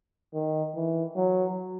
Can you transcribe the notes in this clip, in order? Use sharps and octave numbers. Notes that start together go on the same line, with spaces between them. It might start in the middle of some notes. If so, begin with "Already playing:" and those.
D#3
E3
F#3